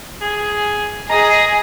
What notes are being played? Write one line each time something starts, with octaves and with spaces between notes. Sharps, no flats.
G#4
G#4 D#5 A#5